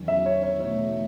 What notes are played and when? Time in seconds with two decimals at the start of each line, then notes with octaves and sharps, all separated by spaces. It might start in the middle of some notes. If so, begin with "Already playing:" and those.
Already playing: E2 D#3 F#3 C#4
0.08 E5
0.26 C#5
0.43 C#5
0.60 E2 B2 A3 D#4 C#5